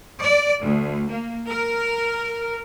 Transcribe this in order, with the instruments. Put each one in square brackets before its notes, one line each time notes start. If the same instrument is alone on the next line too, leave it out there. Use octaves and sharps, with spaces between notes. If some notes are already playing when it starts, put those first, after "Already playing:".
[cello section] D5
D2
A#3
A#4